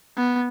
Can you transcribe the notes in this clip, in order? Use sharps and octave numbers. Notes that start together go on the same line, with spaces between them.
B3